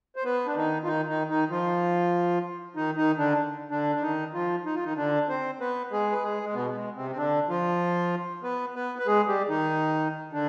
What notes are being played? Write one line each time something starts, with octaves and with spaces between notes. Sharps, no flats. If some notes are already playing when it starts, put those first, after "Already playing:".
C5
B3 B4
D4
D#3 D#4
F4
D#3 D#4
D#3 D#4
D#3 D#4
F3 F4
D#3 D#4
D#3 D#4
D3 D4
D3 D4
D4
D#3 D#4
F3 F4
D#4
F4
D#3 D#4
D3 D4
C4 C5
B3 B4
G#3 G#4
B4
G#3 G#4
G#3
B2 B3
B3
G#3
C3 C4
C4
D3 D4
F3 F4
B3 B4
B3 B4
B4
G#3 G#4
G3 G4
D#3 D#4
D3 D4